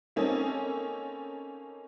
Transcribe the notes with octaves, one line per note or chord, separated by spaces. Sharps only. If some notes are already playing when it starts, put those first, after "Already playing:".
A#3 C4 C#4 D#4 A4